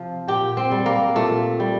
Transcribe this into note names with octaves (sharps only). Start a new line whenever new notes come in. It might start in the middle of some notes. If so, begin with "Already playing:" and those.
Already playing: C3 F3
A#2 G4
C4
G3
A#3
A#2 A3
G3